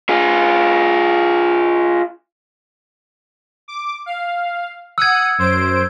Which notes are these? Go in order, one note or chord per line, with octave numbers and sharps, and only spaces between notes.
F4 G#4
D6
F5
F#5 D#6 E6 G#6 C#7
F#2 C5 D7